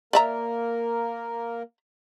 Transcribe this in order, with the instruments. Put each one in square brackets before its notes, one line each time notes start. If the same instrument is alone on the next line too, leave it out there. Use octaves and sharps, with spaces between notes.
[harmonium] A#3 A#4 [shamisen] D5 E5 A#5